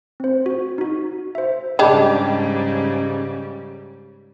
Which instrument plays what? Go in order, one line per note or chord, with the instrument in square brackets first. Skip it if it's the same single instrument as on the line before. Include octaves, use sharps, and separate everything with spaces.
[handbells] C4 C5
F#4
D#4 F#4
C5 E5
[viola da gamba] G#2 C#3 G3 [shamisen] G#3 D4 G4